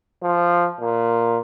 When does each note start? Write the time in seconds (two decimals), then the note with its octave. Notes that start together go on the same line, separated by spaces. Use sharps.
0.23 F3
0.80 A#2